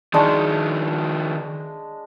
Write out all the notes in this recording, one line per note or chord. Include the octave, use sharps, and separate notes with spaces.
D#3 F3 G#3 D4 C#6